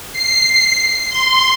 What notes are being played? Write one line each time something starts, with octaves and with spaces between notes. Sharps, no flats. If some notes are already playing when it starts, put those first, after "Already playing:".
C7
C6